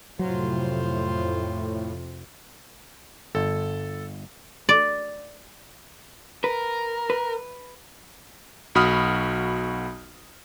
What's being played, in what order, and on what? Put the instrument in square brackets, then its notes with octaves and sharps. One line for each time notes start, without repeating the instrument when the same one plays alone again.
[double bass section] F2 C3 [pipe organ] A2 [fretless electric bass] F#3 [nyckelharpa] F4 C5
[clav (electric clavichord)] G1 [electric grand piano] A4
[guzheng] D5
[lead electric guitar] A#4 [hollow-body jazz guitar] B4
[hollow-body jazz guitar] B4
[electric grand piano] B1 F#4 B5 D#6 F6